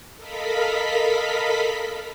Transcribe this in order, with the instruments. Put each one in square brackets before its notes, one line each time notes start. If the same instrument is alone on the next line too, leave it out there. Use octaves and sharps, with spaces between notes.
[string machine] A4 A#4 D#5 F5 B5 B6